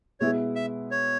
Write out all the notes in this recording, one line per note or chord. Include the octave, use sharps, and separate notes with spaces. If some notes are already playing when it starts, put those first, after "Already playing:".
B2 G#3 B3 E4 G#4 C#5
E5
C#5